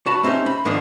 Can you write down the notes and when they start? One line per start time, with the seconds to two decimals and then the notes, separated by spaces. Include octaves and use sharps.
0.06 F#4 A5 B5
0.23 A3 C4 C#4 D#4 G4
0.46 B5
0.65 G#2 D3 D#3 F3 D4 D#5